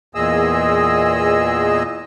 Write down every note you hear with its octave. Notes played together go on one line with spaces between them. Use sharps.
E2 A#2 G#4 D#5 E6